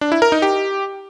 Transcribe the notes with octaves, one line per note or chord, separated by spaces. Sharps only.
D4
E4
A#4
D#4
G4